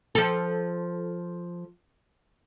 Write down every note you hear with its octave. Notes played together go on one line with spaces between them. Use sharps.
F3 A4